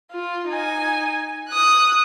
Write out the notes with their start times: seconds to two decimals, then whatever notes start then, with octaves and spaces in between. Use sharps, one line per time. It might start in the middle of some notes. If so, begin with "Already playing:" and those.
0.12 F4
0.48 D#4 G#5
1.49 D#6 F#6